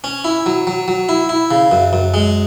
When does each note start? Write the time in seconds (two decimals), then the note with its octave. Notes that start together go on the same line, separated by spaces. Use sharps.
0.04 C#4
0.25 E4
0.46 F#3
0.67 F#3
0.88 F#3
1.09 E4
1.29 E4
1.51 C#3
1.71 F#2
1.93 F#2
2.14 G#3